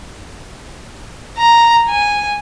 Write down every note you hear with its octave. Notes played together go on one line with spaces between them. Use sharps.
A#5
G#5